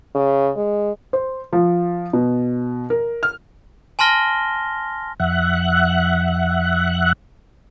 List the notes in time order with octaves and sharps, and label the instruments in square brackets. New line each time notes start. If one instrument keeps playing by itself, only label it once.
[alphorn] C#3
G#3
[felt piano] C5
F3
B2
A#4
F6
[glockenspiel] G#5 A5 C6 F6 A#6 G7
[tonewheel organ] F2 E5 F#5 F#6